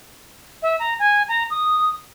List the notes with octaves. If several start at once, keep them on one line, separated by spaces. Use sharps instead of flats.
E5
A#5
G#5
A#5
D#6